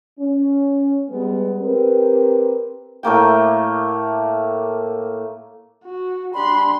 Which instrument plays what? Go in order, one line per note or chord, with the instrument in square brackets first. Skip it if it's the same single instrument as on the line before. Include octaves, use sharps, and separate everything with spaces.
[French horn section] C#4
G3 G#3 B3
C4 G4 A#4 B4
[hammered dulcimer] A2 A3 A#3 G5
[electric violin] F#4
[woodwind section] G3 D4 B5 [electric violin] C6